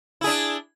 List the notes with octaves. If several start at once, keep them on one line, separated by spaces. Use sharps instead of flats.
D4 E4 G#4